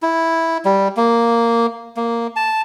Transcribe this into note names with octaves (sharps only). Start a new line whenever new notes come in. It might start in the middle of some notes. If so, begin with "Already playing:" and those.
E4
G3
A#3
A#3
A5